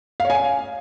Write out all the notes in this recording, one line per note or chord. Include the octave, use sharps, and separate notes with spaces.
F5
C#5
G#5
F5